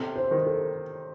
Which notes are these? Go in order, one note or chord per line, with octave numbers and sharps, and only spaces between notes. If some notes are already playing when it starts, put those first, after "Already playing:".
Already playing: C3 A4
C5
D#3
A4